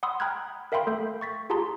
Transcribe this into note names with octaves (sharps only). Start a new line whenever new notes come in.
F#5 B5 C6 D#6 E6
G5 A#5 B5 F6 F#6 G#6
A#4 E5 F5 G5 B5 C6
A3 A4 E5 G6
C#6 A6 B6
F4 G4 G#4 A5 A#5 C6